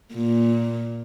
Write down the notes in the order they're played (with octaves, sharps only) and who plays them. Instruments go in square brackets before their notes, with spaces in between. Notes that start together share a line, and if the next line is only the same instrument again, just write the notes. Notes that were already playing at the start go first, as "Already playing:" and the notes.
[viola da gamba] A#2